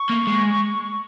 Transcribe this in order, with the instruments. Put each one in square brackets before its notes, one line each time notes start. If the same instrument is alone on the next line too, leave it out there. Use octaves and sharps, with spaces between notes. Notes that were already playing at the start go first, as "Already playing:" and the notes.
Already playing: [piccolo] C#6
[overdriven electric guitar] A#3
G#3